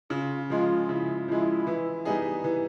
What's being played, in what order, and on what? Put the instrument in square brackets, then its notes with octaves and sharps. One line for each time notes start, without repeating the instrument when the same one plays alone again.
[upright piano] C#3 [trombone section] F4
[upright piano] F3 G#3 [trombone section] F4
[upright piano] C#3 [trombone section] E4
[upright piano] F3 G#3 [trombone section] E4
[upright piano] E3
G3 B3 D#4 G#4
E3